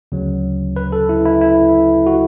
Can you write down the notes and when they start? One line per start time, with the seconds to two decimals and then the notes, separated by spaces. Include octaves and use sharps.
0.12 D2 C#3 F#3
0.76 B4
0.92 A4
1.09 E4
1.25 E4
1.41 E4
2.07 F#4